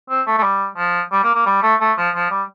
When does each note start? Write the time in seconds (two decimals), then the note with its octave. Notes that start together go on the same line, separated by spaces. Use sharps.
0.10 C4
0.27 A3
0.38 A3
0.43 G3
0.77 F3
1.12 G3
1.23 A#3
1.34 A#3
1.46 G3
1.63 A3
1.81 A3
1.98 F3
2.15 F3
2.31 G3